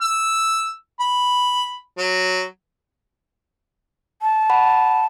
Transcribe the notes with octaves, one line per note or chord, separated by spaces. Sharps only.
E6
B5
F#3
A5
F#5 B5